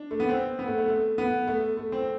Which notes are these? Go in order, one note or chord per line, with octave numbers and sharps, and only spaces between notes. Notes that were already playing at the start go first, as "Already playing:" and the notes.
Already playing: D4
A3
B3
C4
B3
A3
A3
A3
B3
A3
A3
C4